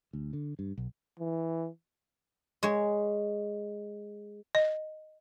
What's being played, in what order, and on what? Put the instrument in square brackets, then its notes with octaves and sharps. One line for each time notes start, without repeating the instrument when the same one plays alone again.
[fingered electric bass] D2
D3
G2
B1
[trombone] E3
[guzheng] G#3 C#5
[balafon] D#5